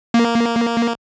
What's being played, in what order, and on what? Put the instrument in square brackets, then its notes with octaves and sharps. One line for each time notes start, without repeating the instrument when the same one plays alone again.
[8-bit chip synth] A#3